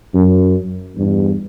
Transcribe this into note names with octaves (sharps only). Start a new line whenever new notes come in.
F#2
E2 G2